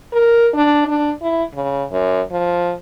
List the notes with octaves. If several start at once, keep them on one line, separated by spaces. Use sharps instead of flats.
A#4
D4
D4
E4
C#3
F#2
F3